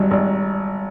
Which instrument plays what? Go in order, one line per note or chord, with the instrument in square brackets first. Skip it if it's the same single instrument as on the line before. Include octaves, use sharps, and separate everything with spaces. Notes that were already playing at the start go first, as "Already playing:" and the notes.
Already playing: [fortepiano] G#1 F#3 [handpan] G3
[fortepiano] G#1